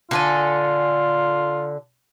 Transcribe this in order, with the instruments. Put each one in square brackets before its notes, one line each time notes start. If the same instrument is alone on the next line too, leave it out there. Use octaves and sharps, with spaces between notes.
[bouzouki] D3 A4 G#5 [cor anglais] F4